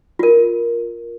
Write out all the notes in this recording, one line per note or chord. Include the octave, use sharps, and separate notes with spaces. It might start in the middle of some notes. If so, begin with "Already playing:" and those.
F4 A#4